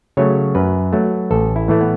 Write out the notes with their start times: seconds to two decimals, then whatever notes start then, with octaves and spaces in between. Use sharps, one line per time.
0.17 C#3 F#3 A3 C#5
0.55 F#2 B4
0.93 F#3 A3
1.31 A1 A4
1.56 E4
1.68 A2 E3 A3
1.81 B3